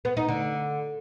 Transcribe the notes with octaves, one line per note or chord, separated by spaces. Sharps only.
B3
D#4
D3